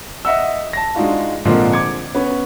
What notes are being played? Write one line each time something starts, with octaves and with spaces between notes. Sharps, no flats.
D#5 E5 F#5 E6
A5 A#6
G#3 D4 D#4 F4 F#4
A#2 D3 F3 G#3 A#3 C4
D6 G#6 C#7
B3 C#4